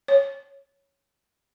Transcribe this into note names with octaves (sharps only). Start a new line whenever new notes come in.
C#5